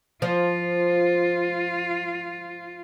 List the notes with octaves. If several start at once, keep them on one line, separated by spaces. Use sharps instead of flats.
F3 F4